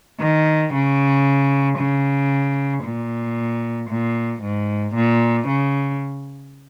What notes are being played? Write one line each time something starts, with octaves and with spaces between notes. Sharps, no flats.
D#3
C#3
C#3
A#2
A#2
G#2
A#2
C#3